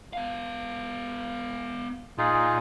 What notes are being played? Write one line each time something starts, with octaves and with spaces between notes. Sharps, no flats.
B3 F5
A#2 D#4 F4 G#4